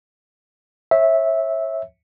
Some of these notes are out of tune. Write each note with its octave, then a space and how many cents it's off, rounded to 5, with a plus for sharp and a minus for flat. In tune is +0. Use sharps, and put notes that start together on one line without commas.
C#5 -30 E5 -10